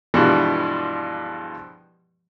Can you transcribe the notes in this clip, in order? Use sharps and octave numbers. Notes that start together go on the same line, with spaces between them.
G2 B2 E3 F3 G3 G#3